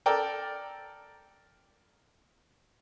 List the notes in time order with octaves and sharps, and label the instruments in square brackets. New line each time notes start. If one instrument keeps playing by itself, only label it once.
[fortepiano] A4 A#4 D5 G5